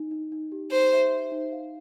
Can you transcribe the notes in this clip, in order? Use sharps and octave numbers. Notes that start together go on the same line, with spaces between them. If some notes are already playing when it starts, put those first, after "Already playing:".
Already playing: D#4
D#4
D#4
G4
D#4 C5
E5
C5
D#4
F5